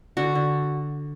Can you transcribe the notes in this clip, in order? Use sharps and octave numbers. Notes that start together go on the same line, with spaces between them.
D3 F#4
D3